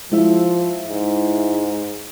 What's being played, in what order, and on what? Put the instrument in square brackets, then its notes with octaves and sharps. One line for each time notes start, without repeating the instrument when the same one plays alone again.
[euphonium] F3 [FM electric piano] G#3 E4 E5
[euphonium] G#2